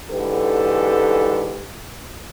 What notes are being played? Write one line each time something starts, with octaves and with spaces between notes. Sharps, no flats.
G#2 D3 E3 G4 A4 B4